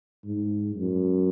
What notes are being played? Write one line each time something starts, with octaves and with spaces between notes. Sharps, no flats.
G#2
F#2